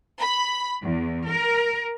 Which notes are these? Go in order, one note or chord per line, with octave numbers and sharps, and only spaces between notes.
B5
E2
A#4